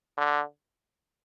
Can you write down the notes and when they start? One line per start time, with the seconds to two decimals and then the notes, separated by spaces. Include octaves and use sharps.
0.18 D3